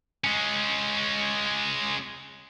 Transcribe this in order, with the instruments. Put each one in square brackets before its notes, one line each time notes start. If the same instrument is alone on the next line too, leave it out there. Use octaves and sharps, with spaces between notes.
[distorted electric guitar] G#3 C#4